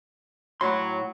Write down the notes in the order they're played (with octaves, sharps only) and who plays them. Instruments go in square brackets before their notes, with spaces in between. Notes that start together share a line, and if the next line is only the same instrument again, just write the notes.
[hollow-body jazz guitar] A2 B5 C6 [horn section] F#3